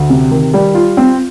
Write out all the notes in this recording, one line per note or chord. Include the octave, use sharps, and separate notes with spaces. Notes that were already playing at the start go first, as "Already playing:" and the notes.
Already playing: D2
C3
D#3
G3
F4
C4